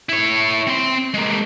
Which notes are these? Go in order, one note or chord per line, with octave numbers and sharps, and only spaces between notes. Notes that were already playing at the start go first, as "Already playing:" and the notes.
E4 C#5
C4 C6
G#3 A#3